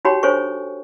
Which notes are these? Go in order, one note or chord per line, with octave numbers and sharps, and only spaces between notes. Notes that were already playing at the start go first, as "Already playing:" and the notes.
D#4 F#4 G4 C#5 G5 B5
D4 A4 C5 C#5 G#5 C#6